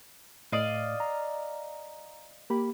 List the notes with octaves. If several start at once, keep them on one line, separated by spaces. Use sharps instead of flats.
A2 D5 D#5 F5
A#5
A#3 G4 B5